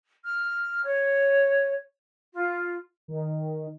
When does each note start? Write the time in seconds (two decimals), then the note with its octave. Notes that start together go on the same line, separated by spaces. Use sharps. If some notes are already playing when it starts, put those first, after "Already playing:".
0.24 F6
0.83 C#5
2.32 F4
3.08 D#3